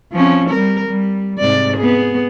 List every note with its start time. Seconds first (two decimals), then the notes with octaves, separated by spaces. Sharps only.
0.12 F3 C4 C#4
0.49 G3 A#4
0.87 G3
1.39 G#2 C3 D5
1.77 B3 G#4